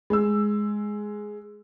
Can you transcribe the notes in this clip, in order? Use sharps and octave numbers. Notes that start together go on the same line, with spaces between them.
G#3 E6